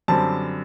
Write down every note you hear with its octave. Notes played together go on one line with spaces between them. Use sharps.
F#2 D3 G3 C4 A5